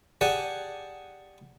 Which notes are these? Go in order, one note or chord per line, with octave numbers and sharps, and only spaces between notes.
G4 G#4 D5 F#5 G#5 A5